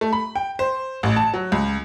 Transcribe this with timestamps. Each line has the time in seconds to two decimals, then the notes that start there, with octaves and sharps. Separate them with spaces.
0.01 A3
0.13 B5
0.35 G5
0.59 C5
1.03 A1
1.16 A5
1.34 F#3
1.52 C#2